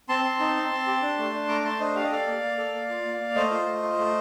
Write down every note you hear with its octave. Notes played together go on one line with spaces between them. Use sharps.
C4 A5 C6
C4
D#4
C4
C4
G4
D4
A3
D4
A3 A#5 D6
A3 A5 C6
D4 C5 D#5
G4 F5
D#5
A4 D5 F5
A#3
A#3
A4
A#3
F4
A#3
A#3
A3 C5 D#5
F4
A3
F4
A3